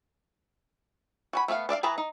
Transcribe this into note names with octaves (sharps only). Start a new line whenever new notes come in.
F#4 G#5 B5
A3 B3 G#4 F5
D4 D5 E5 F5
E3 G#4 B4 A5 A#5
D#4